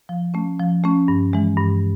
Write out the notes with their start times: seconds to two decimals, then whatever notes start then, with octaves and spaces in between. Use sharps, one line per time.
0.09 F3
0.34 A3 C#4
0.60 F3
0.84 A3 C#4
1.08 G2
1.33 E3 G#3
1.57 G2